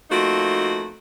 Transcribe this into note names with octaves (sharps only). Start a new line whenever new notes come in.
F3 A3 A#3 C4 D#4 F#4